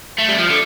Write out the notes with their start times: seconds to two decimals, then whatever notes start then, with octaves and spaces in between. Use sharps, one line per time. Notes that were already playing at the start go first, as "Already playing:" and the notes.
0.18 A3
0.28 G3
0.38 F3
0.50 D3